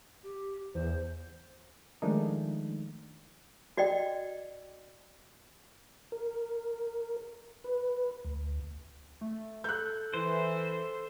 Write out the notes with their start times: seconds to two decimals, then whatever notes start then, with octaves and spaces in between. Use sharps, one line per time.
0.24 G4
0.75 E2 C5
2.02 D#3 F3 G#3 A3 D4 D#4
3.77 F#4 D5 D#5 G5
6.12 A#4
7.64 B4
8.25 D2
9.21 A3
9.64 A4 F#6 G6
10.14 E3 C5